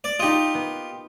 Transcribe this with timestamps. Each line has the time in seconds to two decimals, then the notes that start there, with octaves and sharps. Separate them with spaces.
0.04 D5
0.20 D#4 F4 G4 D#5
0.54 B3